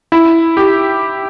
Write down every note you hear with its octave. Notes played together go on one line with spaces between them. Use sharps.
E4
G4